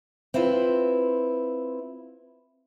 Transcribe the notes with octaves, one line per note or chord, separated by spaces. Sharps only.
C4 E4 F4 B4